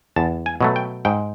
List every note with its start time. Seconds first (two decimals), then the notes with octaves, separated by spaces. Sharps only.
0.16 E2 A5
0.46 G#5
0.61 B2 F#3 A3
0.76 G5
1.05 G#2 G5